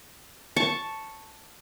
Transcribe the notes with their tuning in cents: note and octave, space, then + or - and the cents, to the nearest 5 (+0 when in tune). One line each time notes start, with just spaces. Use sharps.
A5 +0 C#6 +0